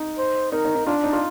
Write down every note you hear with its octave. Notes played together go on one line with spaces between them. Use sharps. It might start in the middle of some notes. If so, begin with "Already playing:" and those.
Already playing: D#4
C5
D#4 A#4
D#4
D#4
D4 F4
D#4
F4